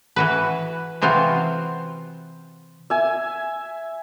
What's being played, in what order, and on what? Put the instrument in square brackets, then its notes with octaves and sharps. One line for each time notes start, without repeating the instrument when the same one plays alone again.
[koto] E3 F#4 B4
C3 E3 C4 F4 F#4
[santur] E5 G#5